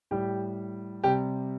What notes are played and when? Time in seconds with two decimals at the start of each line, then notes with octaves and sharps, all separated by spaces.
0.11 A2 G3 G4
1.04 C3 G3 G4